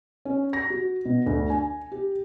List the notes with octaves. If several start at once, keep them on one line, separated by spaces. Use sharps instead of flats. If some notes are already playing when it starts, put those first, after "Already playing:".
C#4
A#6
F#4
B2
D2
G#5
G4